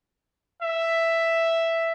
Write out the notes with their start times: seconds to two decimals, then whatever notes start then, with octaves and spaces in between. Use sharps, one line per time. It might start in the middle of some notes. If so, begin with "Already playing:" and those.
0.62 E5